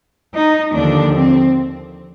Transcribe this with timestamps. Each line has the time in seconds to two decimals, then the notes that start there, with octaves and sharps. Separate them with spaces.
0.34 D#4
0.74 D#2 D3 F3 D4
1.15 C4